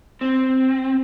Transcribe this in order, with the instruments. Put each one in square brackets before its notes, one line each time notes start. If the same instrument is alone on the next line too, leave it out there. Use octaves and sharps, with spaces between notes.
[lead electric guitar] C4